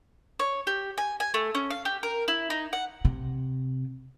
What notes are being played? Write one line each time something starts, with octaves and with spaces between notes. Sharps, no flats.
C#5
G4
G#5
G#5
A3
C#4
F5
G4
A#4
E4
D#4
F#5
C3